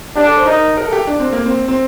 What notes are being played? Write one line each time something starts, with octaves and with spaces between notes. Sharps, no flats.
D4 G4
A4
C5
D#4 A#4
A#4
A4
G4
D4
C4
A#3
C4
C4